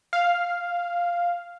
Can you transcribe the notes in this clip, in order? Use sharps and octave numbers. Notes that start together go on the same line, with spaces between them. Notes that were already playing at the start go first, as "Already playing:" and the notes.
F5